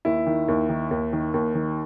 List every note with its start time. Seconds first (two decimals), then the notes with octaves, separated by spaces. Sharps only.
0.05 D#2 E4
0.26 D#3
0.48 D#2
0.69 D#3
0.91 D#2
1.13 D#3
1.34 D#2
1.55 D#3